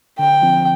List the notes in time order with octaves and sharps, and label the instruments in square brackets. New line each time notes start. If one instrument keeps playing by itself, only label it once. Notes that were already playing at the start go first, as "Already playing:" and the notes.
[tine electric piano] D3 [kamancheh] G5
[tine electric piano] F3 C4